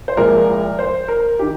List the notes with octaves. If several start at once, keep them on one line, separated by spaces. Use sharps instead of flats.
C5
C2 A#2 F3 G#3 A#4
C5
A#4
D#3 G4